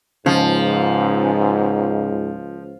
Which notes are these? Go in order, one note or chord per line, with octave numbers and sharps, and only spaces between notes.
C#2 G#2 C#3 F3